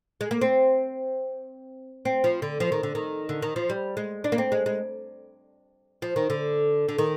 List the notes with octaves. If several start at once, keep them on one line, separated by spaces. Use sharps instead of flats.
G#3
A#3
C4
C4
F3
D3
F3
D#3
D3
D#3
D3
D#3
F3
G3
G#3
D4
A#3
C4
G#3
G#3
F3
D#3
D3
D3
D#3